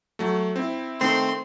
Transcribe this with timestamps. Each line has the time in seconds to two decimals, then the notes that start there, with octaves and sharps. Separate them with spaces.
0.19 F#3 A3
0.56 C4 E4
1.01 D#3 A3 C4 C6